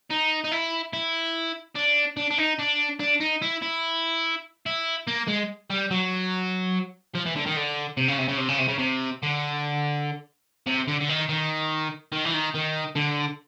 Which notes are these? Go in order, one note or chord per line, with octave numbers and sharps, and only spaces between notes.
D#4
D#4
E4
E4
D4
D4
D4
D#4
D4
D4
D#4
E4
E4
E4
A#3
G#3
G3
F#3
F3
E3
D3
D#3
D3
C3
C#3
C3
C#3
C3
C#3
C3
C#3
C3
D3
C3
D3
D3
D#3
D#3
D#3
E3
D#3
D#3
D3